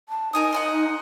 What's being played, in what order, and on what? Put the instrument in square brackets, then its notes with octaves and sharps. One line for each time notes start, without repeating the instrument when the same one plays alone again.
[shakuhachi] A5
[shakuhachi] D#4 [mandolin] A#4 G#5 D#6
[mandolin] F#5 G#5 C6